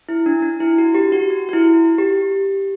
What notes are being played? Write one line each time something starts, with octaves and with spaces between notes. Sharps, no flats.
E4
D4
D4
E4
F#4
G4
F#4
F#4
F#4
E4
G4